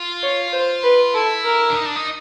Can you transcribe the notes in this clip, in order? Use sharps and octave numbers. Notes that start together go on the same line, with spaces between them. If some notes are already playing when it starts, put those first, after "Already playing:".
Already playing: F4
C#5
C5
B4
E4 A4
A#4
D4
D#4
D4
D#4